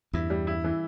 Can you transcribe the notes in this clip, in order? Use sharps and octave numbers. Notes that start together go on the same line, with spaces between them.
E2 G2 E4
G3
E4
E3